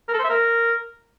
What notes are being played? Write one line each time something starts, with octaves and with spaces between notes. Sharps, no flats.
A#4
A4
C5
E5
A#4